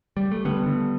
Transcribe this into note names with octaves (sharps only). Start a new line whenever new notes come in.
G3
A3
D3 G3 B3
D3